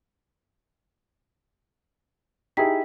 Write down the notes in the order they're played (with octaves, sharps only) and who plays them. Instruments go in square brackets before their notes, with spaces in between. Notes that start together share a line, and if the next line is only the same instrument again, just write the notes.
[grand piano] D#4 E4 G#4 [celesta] G4 G5 B6